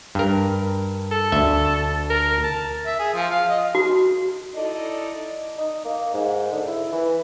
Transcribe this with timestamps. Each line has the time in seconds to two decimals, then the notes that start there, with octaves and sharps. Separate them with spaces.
0.15 G2 A#4
1.11 A4
1.32 D2 E5
2.10 A#4
2.44 A5
2.86 E5
2.99 G#4
3.14 F3
3.31 F5
3.49 D#5
3.75 F#4
4.54 D#4 E4 A4 D5 D#5
5.58 D#4
5.85 A#3
6.14 G#2
6.52 D3
6.67 E4
6.92 E3